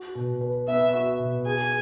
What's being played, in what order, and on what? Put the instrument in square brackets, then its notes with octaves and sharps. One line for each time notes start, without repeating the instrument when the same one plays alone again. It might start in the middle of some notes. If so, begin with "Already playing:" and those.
Already playing: [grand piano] F#4
B2
B4
[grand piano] B3 [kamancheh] E5
[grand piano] F#4
B2
[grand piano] G#4 [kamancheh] G#5